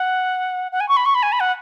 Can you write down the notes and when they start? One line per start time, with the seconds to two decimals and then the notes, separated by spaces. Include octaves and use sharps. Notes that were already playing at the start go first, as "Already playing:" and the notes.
Already playing: F#5
0.72 F#5
0.80 G#5
0.89 C#6
0.97 B5
1.05 C#6
1.15 B5
1.23 G#5
1.32 B5
1.40 F#5